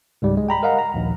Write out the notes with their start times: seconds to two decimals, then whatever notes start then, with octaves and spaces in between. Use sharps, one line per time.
0.22 C#2 G#2 G3
0.37 G#3
0.49 G5 A#5 B5
0.63 A#4 D#5 F5 F#5 A#5
0.79 A#5
0.94 A#1 D#2